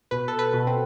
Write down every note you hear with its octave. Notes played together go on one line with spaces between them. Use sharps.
B2 B4
A4
B4
B2
C4